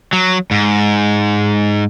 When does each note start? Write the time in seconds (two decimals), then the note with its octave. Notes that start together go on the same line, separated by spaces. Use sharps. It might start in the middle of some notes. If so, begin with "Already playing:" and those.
0.13 F#3
0.51 G#2